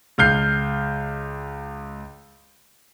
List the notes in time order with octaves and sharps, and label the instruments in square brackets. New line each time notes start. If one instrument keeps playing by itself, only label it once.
[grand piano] C#2 F6 G6 C7